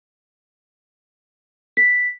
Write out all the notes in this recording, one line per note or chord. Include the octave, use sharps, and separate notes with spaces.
B6